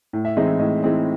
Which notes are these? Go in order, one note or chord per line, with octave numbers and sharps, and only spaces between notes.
A2
E5
E3 G#3 C4 D#4 D#5
A2 D#5
E3 G#3 C4 D#4